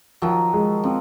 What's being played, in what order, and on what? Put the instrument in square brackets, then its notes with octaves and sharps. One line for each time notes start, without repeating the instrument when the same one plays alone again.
[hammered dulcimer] D#3 F#3 [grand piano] F3
[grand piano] G#3
[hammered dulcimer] F3 [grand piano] C4